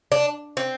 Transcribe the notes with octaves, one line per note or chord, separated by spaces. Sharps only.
D4
C4